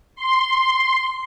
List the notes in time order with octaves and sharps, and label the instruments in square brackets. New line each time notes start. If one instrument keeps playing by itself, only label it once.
[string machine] C6